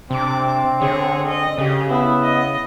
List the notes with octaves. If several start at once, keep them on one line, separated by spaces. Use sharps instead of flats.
C3 C4 D4 D6
D3 G#4 C#5
D#5
C#3 G4 G#4
B3 E4
D#5